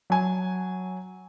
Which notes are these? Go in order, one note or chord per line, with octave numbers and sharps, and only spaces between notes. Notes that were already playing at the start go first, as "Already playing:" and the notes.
F#3 G#5